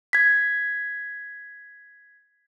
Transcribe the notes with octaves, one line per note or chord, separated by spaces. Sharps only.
G#6 B6